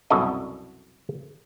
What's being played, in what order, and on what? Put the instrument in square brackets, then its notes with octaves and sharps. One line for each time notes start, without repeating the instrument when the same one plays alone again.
[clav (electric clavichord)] C2 F#2 B2 F#4 A4 D#5